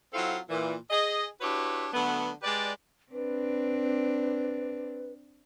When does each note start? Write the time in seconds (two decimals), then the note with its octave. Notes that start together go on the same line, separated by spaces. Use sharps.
0.14 F#3 C4 E4 F4 A4 F5
0.50 A#2 E3
0.91 G#4 D#5
1.41 D4 E4 F#4 G4 B4 C#5
1.93 D3 F#3 A3 B3
2.43 G#3 G4 B4 D5
3.12 C4 D4 B4